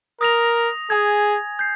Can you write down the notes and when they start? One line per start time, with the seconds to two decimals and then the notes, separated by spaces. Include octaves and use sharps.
0.21 A#4 D#6 A#6 F7
0.90 G#4 G#5 D#6 G#6
1.59 G6 C7